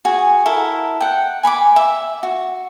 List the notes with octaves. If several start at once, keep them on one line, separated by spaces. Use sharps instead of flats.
F#4 G#4
E4 A4 A#4
F#5 G5
G#5 B5 C#6 D6
E5
F#4